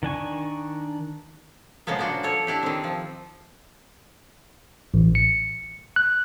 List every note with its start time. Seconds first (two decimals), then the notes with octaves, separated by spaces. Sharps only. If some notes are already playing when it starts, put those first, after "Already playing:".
0.03 D#3 D4 G#5 C#6
1.87 A#2 C#3 F3 G#3 A#3 B3
1.99 D4 F#4 C5 D5
2.23 F3 A4 C#5
2.47 D4 E4 G4
2.63 D#3 C4
2.84 F3
4.94 A1
5.15 C#7
5.96 F#6